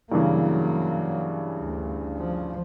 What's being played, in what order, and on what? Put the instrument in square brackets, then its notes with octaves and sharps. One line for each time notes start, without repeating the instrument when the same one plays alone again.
[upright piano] G2 C#3 E3 [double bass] F#3 A#3
[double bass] D2
F3